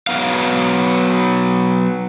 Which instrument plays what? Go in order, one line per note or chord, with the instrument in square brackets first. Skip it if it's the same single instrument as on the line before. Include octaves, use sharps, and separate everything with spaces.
[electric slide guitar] F#3 B3 F5